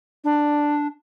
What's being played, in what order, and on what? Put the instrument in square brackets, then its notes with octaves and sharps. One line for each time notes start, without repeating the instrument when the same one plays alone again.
[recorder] D4